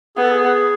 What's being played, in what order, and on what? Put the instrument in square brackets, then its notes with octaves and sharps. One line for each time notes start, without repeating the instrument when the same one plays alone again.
[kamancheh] B3 [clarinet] G#4
[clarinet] A4
G#4